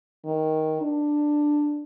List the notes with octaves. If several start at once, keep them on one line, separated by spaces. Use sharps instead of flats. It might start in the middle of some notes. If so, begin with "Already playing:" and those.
D#3
D4